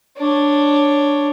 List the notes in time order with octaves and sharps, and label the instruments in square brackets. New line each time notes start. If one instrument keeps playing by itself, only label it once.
[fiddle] D4 C#5